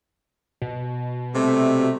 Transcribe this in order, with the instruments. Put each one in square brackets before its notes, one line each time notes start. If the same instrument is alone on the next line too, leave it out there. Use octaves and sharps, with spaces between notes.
[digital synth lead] B2
[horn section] C3 G3 A3